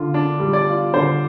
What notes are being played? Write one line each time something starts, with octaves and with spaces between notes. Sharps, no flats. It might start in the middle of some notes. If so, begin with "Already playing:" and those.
Already playing: D3 F4
D4
G3
D5
F4
D3 C5